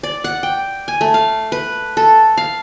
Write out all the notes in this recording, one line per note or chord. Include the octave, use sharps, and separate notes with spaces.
D5
F#5
G5
G#5
A3
F5
B4
A4
F5